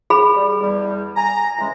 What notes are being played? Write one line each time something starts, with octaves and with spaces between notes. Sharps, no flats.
G#4 B5
G3
E2 G3
G#5 A#5
C#3 E3 G#3